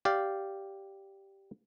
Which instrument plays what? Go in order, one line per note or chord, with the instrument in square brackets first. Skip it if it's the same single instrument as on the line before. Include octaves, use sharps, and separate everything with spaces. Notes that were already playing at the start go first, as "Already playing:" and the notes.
[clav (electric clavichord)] G4 D5 F5